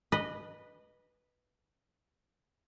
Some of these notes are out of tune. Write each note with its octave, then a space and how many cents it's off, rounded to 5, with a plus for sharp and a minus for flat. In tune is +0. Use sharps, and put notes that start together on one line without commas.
B4 -5 D#5 -15